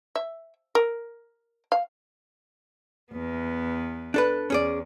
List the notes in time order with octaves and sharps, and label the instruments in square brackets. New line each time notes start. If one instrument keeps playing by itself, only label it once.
[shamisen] E5
A#4
F5
[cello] E2 B3
[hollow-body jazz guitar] D4 A4 B4
[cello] E2 [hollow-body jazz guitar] C#4 G#4 D5